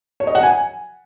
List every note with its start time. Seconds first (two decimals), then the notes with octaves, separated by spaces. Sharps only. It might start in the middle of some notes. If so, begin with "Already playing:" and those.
0.20 C#5
0.27 D#5
0.35 F#5
0.43 G#5